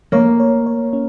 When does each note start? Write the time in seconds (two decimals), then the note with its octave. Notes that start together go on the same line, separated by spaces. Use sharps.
0.12 A#3 C#5
0.40 C#5
0.66 C#5
0.93 C#4